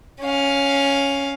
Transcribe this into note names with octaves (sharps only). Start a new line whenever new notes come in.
C#4 F5